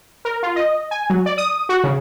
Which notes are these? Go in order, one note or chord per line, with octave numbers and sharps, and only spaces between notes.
A#4
F4
D#5
G#5
F#3
D5
D#6
F#4
C#3